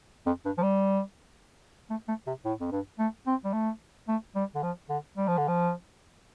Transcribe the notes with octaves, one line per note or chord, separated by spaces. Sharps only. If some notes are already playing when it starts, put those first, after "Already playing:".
F2
G2
F3
G3
A3
A3
C3
A2
F2
G2
A3
C4
G3
A3
A3
G3
D3
F3
D3
G3
F3
D3
F3